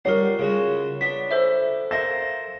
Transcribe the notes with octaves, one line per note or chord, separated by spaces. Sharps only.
G3 D#4 F4 A#4 C#5 F#5 C7
C#3 G#3 F#4
B3 D4 B6
A4 C5 E5
A4 A#4 C5 E5 F5 A#6